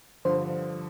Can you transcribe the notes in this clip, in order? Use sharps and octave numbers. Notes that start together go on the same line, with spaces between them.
G2 D3 F3 C5